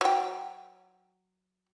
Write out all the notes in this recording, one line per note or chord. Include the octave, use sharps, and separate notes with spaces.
F#3 G5